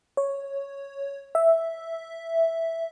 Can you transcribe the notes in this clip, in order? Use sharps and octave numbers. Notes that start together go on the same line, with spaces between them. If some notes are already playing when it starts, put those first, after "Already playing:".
C#5
E5